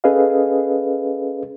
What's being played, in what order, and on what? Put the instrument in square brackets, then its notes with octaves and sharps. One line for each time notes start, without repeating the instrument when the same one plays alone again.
[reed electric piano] C#4 G#4 A4 B4 D#5 F5